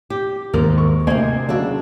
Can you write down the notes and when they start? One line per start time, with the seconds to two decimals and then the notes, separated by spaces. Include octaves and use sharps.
0.10 G4
0.53 D#2 G#2 A#3 A#4
0.78 C#6
1.07 D2 C3 A#3 C5 D#5 G#5
1.49 C#3 F#3 D4 F#4 E5